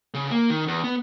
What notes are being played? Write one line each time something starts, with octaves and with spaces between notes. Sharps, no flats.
C#3
A#3
D#3
E2
B3